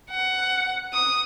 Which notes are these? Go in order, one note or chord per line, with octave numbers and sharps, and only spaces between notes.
F#5
D#6